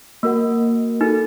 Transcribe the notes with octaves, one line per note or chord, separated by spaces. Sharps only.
A#3 F#4 A#4 F#5
D#4 F#4 A4